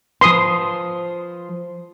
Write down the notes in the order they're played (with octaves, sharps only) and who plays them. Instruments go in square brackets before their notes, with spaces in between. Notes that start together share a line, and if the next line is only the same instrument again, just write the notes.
[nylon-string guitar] F3 B4 [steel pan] C6 D#6